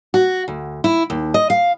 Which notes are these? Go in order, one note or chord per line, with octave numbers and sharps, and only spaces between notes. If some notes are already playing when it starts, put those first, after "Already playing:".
F#4
D2
E4
D#2
D#5
F5